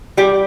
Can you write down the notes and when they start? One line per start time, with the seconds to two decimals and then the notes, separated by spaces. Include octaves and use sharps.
0.17 G3 G4